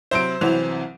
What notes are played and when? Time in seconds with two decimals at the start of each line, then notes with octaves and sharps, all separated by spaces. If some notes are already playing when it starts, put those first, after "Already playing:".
0.11 C3 F#3 E4 C5 D7
0.41 C2 E3 F#3 C4 F7